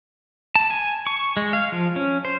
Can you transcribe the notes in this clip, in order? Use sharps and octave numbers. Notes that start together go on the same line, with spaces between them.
A5
G#5
C#6
G#3
F5
F3
C#4
C5